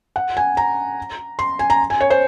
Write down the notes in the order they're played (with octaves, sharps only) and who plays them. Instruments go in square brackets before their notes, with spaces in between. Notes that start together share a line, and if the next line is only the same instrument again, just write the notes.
[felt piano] F#5
G#5
A#5
C6
G#5
A#5
G#5
C#5
C5